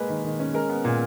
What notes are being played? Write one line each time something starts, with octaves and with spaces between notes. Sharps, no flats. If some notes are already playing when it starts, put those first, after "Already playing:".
Already playing: G#3 A#3 B4
D#3
D#3
C#4
G#3 A#4
B3
A#2